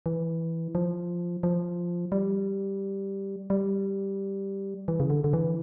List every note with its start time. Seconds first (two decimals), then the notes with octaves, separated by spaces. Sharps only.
0.06 E3
0.75 F3
1.43 F3
2.12 G3
3.50 G3
4.88 E3
5.00 C#3
5.10 D3
5.24 D3
5.33 E3